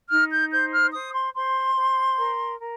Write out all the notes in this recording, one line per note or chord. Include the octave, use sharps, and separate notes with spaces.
D#4 F6
G6
C5 G6
F6
C5 D#6
C6
C5 C6
C5
A#4
A#4